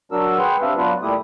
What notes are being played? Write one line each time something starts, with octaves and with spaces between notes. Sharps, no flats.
F#3 D4 F#4 A#4 E6
G#4 B4 F#5 G5 C6
C4 D4 G4 B4 E5 F5
F#3 B3 D4 F4 B4
A#2 G3 A3 E4 G4 D#6